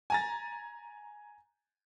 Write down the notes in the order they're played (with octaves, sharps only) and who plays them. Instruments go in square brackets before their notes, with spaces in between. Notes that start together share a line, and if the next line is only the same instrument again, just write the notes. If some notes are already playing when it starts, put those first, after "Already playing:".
[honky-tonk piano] G#5 A#5 A6